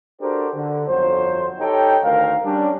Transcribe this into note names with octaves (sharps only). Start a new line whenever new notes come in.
D4 F#4 G4 A4 A#4 C5
D3
G1 F2 F#3 C5
D#4 G4 A4 C#5 G5
D2 D#3 A#4 F5
G3 C#4 D4